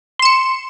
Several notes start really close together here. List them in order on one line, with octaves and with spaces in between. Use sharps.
C6 E7 C#7